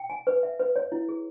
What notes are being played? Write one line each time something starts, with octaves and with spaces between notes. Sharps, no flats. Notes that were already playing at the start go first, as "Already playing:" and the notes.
Already playing: G5
G#5
B4
E5
B4
C#5
E4
G#4